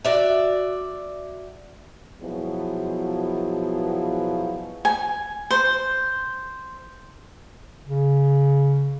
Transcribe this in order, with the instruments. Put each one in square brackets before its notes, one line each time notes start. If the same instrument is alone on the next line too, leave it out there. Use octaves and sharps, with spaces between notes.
[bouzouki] F#4 D5 E5
[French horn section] B2 F3 F#3 G#3 B3 E4
[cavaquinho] G#5
C5
[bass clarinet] C#3